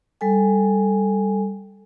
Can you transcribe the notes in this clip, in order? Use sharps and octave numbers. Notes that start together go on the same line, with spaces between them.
G3 A4 G#5